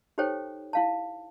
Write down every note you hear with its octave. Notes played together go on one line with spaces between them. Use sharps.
D#4 G4 A4 C5 C#5 G5
E4 F5 A5